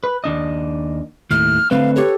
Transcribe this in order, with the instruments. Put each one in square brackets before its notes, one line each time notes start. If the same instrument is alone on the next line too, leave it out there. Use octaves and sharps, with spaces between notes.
[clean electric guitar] B4
D#2 D4 D#5
[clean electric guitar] D#2 A2 [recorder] F6
[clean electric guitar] D3 A3 C4 [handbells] B4 [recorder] F5
[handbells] G4 A4 [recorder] C#5